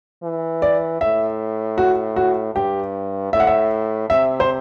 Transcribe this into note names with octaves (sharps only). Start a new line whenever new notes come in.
E3
D5
A2 E5
F#4
F#4
G2 G4
A2 E5
F#5
E5
C3 E5
C5